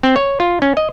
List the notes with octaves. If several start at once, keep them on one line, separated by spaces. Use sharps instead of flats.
C4
C#5
F4
C#4
D#5